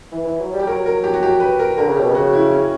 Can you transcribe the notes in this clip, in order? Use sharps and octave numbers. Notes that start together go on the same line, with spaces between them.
E3
E3
F#3
G3
G4
F#3 A#4
A#4
G4
F#4
G4
B4
A#4
D3 A#4
C#3
B2 G4
C#3 F#4
E4
C#4